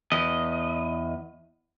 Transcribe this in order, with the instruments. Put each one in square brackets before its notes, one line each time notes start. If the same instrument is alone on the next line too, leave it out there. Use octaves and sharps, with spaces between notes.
[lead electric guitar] E2 D#5